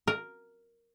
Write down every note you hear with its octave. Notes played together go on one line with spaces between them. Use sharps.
A#4